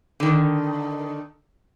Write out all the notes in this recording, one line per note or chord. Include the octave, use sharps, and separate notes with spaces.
D3 D#3